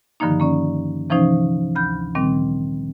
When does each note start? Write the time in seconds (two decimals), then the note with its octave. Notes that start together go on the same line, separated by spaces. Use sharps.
0.20 G2 D3 D#3 F3 A#3 D#4
0.40 A#3 C#4 D5
1.10 C3 E3 F3 C#4 D#4 C5
1.75 D2 B5 G6
2.15 A#2 D#3 G3 C4